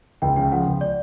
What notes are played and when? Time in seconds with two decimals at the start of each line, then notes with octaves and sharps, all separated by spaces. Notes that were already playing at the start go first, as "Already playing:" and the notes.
0.22 C#2 G5
0.36 C#3 G5
0.52 F3 F#5
0.67 C#2
0.81 D5